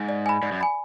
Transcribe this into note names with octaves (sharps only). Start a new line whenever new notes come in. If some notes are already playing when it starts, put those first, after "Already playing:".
Already playing: G#2
D5
G#5 B5
G#2 D5
F#2
G#5 B5